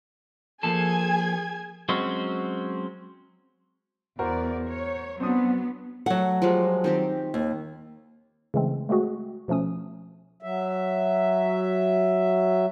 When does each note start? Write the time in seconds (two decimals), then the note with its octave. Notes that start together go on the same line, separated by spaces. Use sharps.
0.63 F3 A#3 G#4 A4 G#5 G#6
1.89 F#3 G#3 C4 C#4 F#4
4.19 E2 F#4 A#4 C5 D5
4.68 C#5
5.20 F#3 B3 C4 D4 D#6
6.06 F#3 A3 F#5
6.42 F3 G3 G#3
6.84 D#3 C4 G4
7.34 D#2
8.54 C#3 E3 G#3 A3 C4
8.89 G#3 A3 C4 F#4 G#4
9.48 B2 F3 A3 C#4 D#6
10.43 F#3 E5